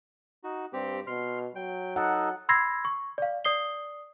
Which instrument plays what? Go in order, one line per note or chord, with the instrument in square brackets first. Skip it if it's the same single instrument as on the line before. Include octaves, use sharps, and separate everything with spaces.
[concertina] D#4 F#4
[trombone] G2 [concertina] C4 G4
[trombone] B2 [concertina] C6 F6
[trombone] F#3 [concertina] G5
[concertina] D#4 A4 [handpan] F#5
[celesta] B5 C6 E6 G#6 A#6 C7
C#6
D5 F5
D5 D#6 C7 G7